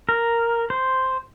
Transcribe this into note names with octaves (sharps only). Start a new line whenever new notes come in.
A#4
C5